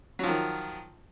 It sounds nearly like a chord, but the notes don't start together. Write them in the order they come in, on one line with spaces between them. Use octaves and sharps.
F#3 F3 D#3